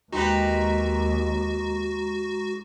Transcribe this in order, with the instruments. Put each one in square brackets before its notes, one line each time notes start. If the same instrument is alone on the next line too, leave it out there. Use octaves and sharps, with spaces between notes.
[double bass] D#2 [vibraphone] G#3 A#5 C6 [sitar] D#4 G4 B4 [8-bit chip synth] F#4